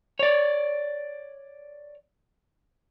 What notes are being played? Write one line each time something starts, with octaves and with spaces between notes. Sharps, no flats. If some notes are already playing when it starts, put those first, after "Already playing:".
C#5 D5